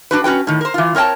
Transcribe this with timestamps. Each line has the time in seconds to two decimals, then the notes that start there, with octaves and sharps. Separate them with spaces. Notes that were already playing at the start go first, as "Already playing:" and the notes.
0.11 D4 F#4 B4
0.24 C#4 F#4 B4 G5
0.47 A2 D#3
0.61 A#4 C5
0.74 E3 F4
0.95 C4 A#4 C#5 G5 A5